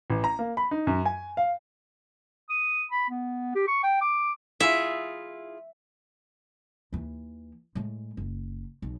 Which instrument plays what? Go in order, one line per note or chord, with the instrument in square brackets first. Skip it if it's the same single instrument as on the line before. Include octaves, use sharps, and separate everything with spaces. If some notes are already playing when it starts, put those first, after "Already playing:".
[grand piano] A1
A#5
A#3
B5
D#4
F#2
G#5
F5
[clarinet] D#6
B5
B3
G4
C#6
G5
D6
[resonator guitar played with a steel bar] E4 F4 G#4 [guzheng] E5
[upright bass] D#2 E3
A2 G#3
F#1
B1